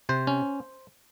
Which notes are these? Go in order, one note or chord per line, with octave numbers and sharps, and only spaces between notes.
C3 C5
C#4